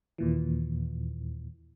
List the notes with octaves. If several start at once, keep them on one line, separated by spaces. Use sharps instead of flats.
D#2 A#2 E3